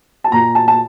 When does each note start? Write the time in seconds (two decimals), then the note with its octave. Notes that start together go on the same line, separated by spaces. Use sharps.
0.24 A5
0.32 A#2 A#5
0.55 A5
0.68 A5